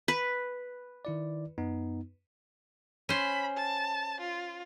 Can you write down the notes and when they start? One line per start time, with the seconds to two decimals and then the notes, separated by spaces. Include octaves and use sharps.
0.08 B4
1.05 D#3 E4 D5
1.58 F#2 B3 D#4
3.09 C#4 C5 B5
3.56 A5
4.20 F4